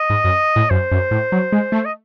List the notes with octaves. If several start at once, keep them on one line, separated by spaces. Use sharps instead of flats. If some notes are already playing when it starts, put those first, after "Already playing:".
Already playing: D#5
G#2
F#2
A2
F#2 C5
F#2
A2
F#3
G#3
A3
D#5